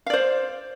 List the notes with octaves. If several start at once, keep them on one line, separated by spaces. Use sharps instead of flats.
C5 D5 F5